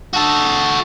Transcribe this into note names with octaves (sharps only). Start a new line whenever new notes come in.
F#4 A4